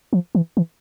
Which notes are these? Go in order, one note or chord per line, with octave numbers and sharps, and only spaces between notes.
F3
E3
E3